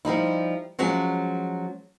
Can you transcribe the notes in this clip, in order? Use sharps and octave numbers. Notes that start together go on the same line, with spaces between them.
F3 G3 D#4 E4
F3 F#3 G#3 C#4